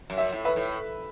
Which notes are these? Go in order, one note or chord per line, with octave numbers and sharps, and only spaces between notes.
F#2
E5
A2
B4 E5
A2